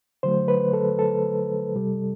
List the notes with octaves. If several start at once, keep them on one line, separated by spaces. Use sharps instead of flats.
D3 F#3 A3 C5
B4
A4
A4
C3 G3